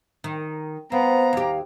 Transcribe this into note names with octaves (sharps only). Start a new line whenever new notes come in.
D#3
B3 C4 F5 A#5
D#2 G4